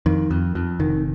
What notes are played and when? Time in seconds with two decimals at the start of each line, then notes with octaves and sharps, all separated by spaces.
0.06 F2 D#3
0.31 F2
0.55 F2
0.80 F1 D#3